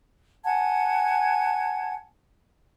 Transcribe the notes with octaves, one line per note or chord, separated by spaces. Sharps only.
F#5 G#5 A5 G#6